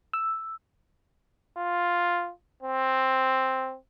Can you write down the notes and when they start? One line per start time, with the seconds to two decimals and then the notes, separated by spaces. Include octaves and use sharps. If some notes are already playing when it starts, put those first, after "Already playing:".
0.13 E6
1.57 F4
2.63 C4